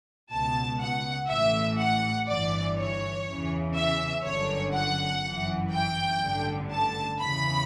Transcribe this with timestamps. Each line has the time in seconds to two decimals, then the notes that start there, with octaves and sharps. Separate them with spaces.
0.31 C#2 B2 A5
0.80 F#5
1.29 A1 A2 E3 E5
1.79 F#5
2.28 G1 G2 E3 D5
2.77 C#5
3.27 E2 C#3 E3
3.75 E5
4.24 G1 F#2 D3 C#5
4.74 F#5
5.23 G1 F#2 E3
5.72 G5
6.21 A1 G2 D3
6.71 A5
7.20 E2 C#3 E3 B5